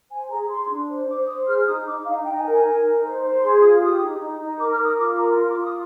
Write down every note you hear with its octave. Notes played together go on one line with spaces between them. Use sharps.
C5 G#5
G#4 A#5
G#4 C6
D4
C5
C5 D6
C5 D#6
G#4 F6
D#4 D#6
D#4 D6
D#4 F5
D#4 G5
G#5
A#4
G#5
A#4
D#4
C5
C5
G#4 C6
F4 D#6
G4 D#6
D#4
D#4
D#4
A#4 D6
F6
A#4
D#6
F4 D6
A#4 A#5
F4 C6
D6
F4
D#6